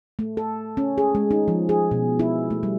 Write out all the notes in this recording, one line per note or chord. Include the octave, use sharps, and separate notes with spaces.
A3
A4
C#4
G#4
G#3
D#4
F3
G#4
B2
E4
A3
G3